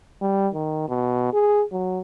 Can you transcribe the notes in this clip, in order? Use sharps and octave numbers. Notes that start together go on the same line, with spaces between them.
G3
D#3
B2
G#4
F#3